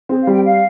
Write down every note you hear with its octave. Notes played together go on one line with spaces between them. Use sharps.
C4 G#4
F5
G3
G5
F5